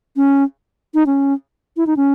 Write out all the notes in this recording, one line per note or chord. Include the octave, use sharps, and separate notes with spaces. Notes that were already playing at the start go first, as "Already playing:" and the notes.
C#4
D#4
C#4
E4
D#4
C#4